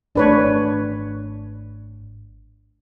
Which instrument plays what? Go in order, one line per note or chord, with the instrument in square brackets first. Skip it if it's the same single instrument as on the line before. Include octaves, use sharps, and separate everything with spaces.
[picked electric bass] G#1 A3 [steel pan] D4 B4 C#5